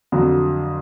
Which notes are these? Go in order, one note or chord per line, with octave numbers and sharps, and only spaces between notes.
F2 D3 F#3